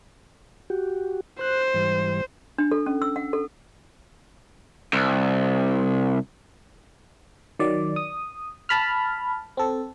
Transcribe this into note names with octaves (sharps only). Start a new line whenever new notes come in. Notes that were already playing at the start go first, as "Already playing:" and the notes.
F#4 G4
C5 F#6
G#2 E3 G3
D4
A4
C#4
E6
F#5
A4
C2
D#3 F#3 D5
D#6
A5 B5 F6
C4 A4